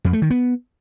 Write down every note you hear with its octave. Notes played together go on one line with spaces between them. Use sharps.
F2
A3
D#3
B3